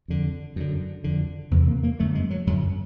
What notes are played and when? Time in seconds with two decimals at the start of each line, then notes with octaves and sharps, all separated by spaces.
0.08 F2 D3
0.56 F#2 D3
1.04 F2 D3
1.51 E2 C3 B3
1.67 A#3
1.83 A#3
1.99 F#2 D3 A3
2.15 G#3
2.30 F#3
2.47 F#2 D3 F#3